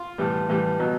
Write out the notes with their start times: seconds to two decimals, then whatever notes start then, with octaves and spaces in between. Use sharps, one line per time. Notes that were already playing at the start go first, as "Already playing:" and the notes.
Already playing: F4
0.18 A2 E3 G3
0.49 A2 E3 G3
0.80 B2 F#3